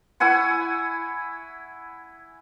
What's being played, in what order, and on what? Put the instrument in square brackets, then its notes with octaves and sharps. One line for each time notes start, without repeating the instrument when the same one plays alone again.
[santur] E4 F#5 G#5 C#6